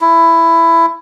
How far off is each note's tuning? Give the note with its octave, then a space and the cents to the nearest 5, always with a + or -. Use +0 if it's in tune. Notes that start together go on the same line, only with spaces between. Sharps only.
E4 +10